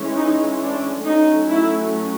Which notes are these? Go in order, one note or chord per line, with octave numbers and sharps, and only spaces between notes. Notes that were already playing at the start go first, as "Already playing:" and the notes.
Already playing: E3 G#3 C#4
D#4
D4
F#3 A3 C#4 D#4
E4